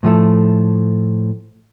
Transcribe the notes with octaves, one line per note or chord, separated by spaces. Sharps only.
A2 F3 A3 A4